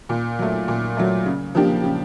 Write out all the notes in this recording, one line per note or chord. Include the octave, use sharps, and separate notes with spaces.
A#2
F#3 A3
A#2
F#3 A3
C#3
F3 A#3 D4 G4
C#3